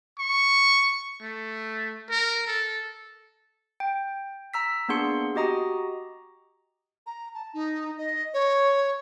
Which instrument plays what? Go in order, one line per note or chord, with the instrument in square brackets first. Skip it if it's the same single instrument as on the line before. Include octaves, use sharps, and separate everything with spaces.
[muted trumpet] C#6
A3
A#4
A4
[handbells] G5
A#5 E6 B6
A#3 B3 D4 G#4 C6 C#7
F#4 G4 D#5 A#5 D#6
[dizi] A#5
A5
D#4
D#5
C#5